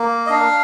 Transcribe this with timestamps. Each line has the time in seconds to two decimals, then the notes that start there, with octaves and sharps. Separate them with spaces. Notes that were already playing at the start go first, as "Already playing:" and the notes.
Already playing: A#3
0.26 D#5
0.30 D4 F5